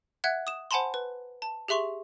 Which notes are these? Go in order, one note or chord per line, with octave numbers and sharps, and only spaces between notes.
E5 F#5 F#6 G#6
D#6 E7
C5 F#5 G#5 A5 B5 C6
B4
A5
G4 G#4 E5 C6 C#6 F7